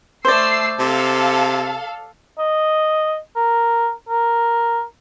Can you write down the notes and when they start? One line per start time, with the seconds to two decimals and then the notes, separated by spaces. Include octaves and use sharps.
0.25 A3 C5 D5 E6 C7
0.79 C3 A4 F5
2.38 D#5
3.35 A#4
4.09 A#4